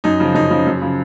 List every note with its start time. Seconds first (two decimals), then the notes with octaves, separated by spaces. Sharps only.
0.04 F#2 D#4
0.20 C#3 F3
0.35 F#2 D#4
0.51 C#3 F3
0.67 F#2
0.81 C#3 F3